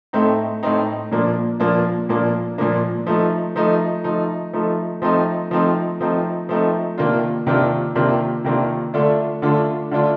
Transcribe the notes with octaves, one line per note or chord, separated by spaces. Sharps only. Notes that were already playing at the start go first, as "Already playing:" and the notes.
A2 A3 C4 D#4
A2 A3 C4 D#4
A#2 F3 A#3 D4
A#2 F3 A#3 D4
A#2 F3 A#3 D4
A#2 F3 A#3 D4
F3 A3 D#4
F3 A3 D#4
F3 A3 D#4
F3 A3 D#4
F3 A3 C4 D#4
F3 A3 C4 D#4
F3 A3 C4 D#4
F3 A3 C4 D#4
C3 D#3 A#3 D4 F4
C3 D#3 A#3 D4 F4
C3 D#3 A#3 D4 F4
C3 D#3 A#3 D4 F4
D3 A3 D4 F4
D3 A3 D4 F4
D3 A3 D4 F4